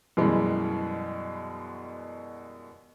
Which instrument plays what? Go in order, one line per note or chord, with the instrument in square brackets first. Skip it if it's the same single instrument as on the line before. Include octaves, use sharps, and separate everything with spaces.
[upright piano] F#2 B2 E3 G3 G#3